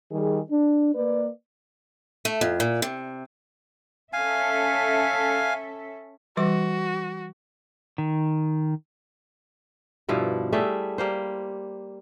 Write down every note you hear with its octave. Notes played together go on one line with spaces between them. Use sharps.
D#3 G3 G#4
D4
A#3 B4 D5
A3
F2
A#2
C3
C#4 A4 E5 F5 G#5
E3 G3 F#4 D6
D#3
G2 B2 F3 E4
G3 A3 G#4 E5
G3 A#3 C5